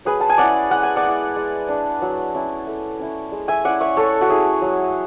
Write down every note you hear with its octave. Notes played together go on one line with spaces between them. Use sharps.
F#3 G#4 B4
A5
G#5
C#4 E4 D5 F#5
G#3 F#5
G#5
D5 F#5
B3 E4
G#3
D4
F#3
C#4 E4
A3
C#4 E4
G#3
E5 G#5
C#4 E4 D5 F#5
C#5 E5
A3 A4 C#5
F#4
C#4 E4 G#4
F#3